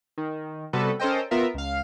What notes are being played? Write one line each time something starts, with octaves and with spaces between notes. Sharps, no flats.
D#3
C3 G3 B3 F#4 A4 B4
C#4 A4 A#4 C5 D#5 G5
B3 F4 A#4 E5
C#2 F5